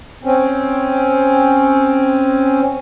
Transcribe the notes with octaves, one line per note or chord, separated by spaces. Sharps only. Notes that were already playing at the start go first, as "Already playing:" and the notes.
C4 C#4